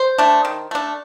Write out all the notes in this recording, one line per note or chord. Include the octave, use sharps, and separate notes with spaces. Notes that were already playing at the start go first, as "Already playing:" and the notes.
Already playing: C5
A3 D4
D#3
A3 D4